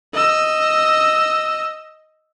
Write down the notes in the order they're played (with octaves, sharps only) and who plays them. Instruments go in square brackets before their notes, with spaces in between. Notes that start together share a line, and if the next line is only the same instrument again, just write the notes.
[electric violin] D#5 E6